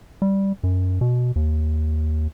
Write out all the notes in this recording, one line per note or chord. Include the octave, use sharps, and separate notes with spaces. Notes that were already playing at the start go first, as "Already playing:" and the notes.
G3
F#2
B2
D#2